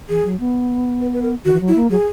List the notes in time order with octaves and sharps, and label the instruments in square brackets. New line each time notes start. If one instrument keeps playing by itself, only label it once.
[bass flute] E3 [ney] G#4
[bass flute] F#3
B3
[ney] B4
B4
A#4
[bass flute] D#3 [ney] F#4
[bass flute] E3
F#3
[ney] E4
[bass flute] A#3
[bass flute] F#3 [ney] G#4